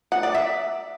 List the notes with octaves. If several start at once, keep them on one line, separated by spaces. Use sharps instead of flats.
F#5
D5
E5